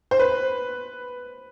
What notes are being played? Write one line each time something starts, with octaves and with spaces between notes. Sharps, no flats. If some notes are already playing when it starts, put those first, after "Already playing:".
C5
B4